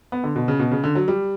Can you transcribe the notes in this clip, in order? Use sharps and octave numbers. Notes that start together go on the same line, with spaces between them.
B3
D3
B2
C#3
B2
C#3
D3
F#3
G3